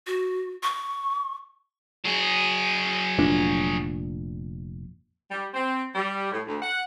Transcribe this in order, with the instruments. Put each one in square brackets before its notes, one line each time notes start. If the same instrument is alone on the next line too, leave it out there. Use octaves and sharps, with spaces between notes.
[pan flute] F#4
C#6
[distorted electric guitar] F#3 G#4
[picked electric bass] F1 A#2 D4
[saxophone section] G3
C4
G3
A2
D2
F#5